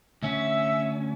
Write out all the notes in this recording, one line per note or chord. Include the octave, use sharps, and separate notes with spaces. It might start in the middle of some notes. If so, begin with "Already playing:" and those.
D2 C#4 E5